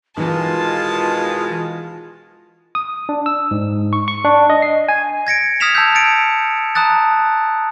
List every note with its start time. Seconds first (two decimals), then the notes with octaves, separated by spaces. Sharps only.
0.18 B2 D#3 E3 G#3 D#4 F4 A5
2.75 D#6
3.09 D4
3.26 E6
3.51 G#2
3.93 C#6
4.08 C#6
4.25 D4
4.50 D#5
4.62 C7
4.89 G#5
5.27 G#6 A#6 C#7 D7
5.60 D#6 F6 G#6 B6 E7 F7
5.75 A5 E6 G6
5.95 A6 C#7 D7
6.75 A5 A#5 D#6 F#6 A6